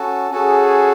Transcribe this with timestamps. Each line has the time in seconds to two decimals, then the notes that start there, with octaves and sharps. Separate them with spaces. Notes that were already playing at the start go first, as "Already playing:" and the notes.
Already playing: C#4 F#4 A4
0.31 C#4 F#4 G#4 A4